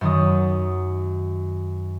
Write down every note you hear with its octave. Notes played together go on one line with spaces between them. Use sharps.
F#2 D#3 D#6